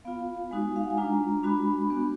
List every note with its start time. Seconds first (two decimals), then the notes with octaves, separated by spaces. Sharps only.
0.05 B3 F4 F5
0.51 G#3 D#4 F#4 G#5
0.76 F5
0.83 F#5
0.90 G#5
0.97 G#3 D4 F4 A#5
1.43 G#3 D4 F#4 B5
1.90 B3 D4 F#4